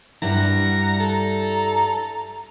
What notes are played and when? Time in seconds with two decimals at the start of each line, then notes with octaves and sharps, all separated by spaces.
0.22 G2 G3 E4 F#5 A#5
1.00 A4 A#5